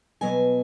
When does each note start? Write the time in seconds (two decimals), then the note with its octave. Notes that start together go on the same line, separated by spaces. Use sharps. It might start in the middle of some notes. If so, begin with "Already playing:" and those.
0.21 B2 F#3 B3 G#5